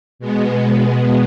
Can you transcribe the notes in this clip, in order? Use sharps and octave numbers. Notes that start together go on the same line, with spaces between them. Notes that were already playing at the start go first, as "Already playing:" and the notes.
B2 G#3 B3